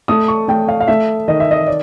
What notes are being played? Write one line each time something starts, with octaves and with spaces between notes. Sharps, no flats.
A3 D#6
C#6
A3 G5
F5
F5
A3 E5
D#3 D#5
E5
D#5
D5